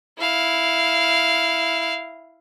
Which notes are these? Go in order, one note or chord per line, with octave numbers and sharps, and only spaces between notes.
E4 F5